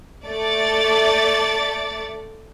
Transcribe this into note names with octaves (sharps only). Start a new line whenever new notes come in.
A3 D5 A6